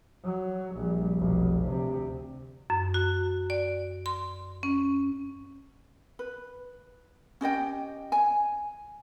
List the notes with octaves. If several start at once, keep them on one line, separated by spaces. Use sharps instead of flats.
F#3
A#1 G3
F1 B1
D2 C3
F#2
F#4
D5
C6
C#4
B4
C#4 G4 D#5 G5
G#5